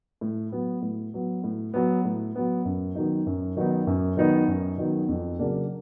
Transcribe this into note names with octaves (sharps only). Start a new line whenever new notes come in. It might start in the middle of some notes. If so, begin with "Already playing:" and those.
A2
F#3 B3
A2
F#3 B3
A2
F#3 B3
A2
F#3 B3
F#2
D#3 F#3 B3 D#4
F#2
D#3 F#3 B3 D#4
F#2
D#3 F#3 B3 D#4
F#2
D#3 F#3 B3 D#4
F2
C#3 F#3 A#3 D4